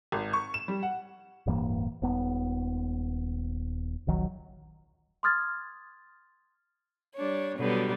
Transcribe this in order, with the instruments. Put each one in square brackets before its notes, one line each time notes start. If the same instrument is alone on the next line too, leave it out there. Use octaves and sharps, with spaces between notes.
[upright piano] G#1
C#6
E7
G3
F#5
[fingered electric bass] D1 G2 E3 A#3
D#1 B3
D#1 A#1 D#3 F#3
[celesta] C6 D6 D#6 F6 G#6 A6
[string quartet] G3 D4 C#5
B2 D3 F#3 G3 B3